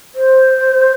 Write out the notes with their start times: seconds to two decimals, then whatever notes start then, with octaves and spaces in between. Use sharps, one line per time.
0.15 C5